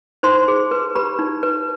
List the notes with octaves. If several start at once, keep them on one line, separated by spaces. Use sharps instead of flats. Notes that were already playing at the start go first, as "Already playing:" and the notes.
D#4 C5 C6
G#4
B4
G4 B4 B5
D#4
B4